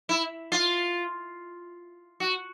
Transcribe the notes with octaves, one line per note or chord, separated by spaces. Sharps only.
E4
F4
F#4